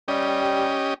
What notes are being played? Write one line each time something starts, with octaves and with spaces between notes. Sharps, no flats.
G3 C#4 G4 D#5